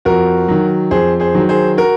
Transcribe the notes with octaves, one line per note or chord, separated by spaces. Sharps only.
F2 F#4 A#4
D#3 F#3
F2 G#4 C5
G#4 C5
D#3 F#3
G#4 C5
F#4 A#4